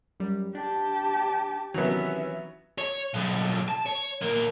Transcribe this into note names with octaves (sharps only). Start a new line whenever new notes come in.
F#2 G3
D4 G4 A5
C3 D#3 E3 F#3 B3 C#4 E5
C#5
B1 D3
A5
C#5
E2 A#3